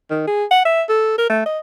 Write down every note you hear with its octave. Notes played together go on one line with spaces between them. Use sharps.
D#3
G#4
F#5
E5
A4
A#4
A3
D#5